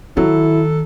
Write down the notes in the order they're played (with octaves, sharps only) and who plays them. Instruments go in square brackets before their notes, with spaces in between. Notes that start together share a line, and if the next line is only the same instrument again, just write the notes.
[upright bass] D#3 [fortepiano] F#3 [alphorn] E4 [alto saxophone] A4